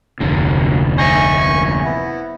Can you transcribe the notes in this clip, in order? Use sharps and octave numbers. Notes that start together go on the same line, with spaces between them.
F1 D2 C3 F#3 D4
C5 D#5 E5 G#5 C#6
B3 E4